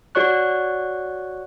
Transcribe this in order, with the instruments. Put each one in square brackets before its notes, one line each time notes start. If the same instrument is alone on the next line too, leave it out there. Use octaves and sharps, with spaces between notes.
[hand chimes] F#4 C#5 D5 C#6 F#6